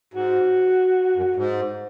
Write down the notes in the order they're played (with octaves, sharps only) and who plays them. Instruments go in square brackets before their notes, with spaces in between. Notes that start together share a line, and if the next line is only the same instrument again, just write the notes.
[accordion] G#2 [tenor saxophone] F#4
[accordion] F#2
G#2